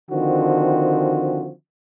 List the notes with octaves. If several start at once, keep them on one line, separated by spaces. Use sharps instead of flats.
D3 D#3 F3 C4 F#4